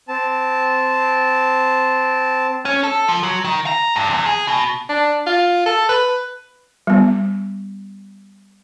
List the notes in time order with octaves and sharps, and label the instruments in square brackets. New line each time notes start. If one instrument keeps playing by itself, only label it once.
[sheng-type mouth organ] C4 A5
[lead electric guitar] C#4
A4
F3
F#3
D#3
A#5
G2
E2
G#4
B2
[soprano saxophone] D4
F4
A4
B4
[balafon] G3 B3